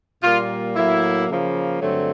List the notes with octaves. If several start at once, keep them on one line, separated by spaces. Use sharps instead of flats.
A#2 G3 A#3 F4
A2 F#3 A#3 E4
C#3 F3 A#3
G2 D3 F#3 A3 C4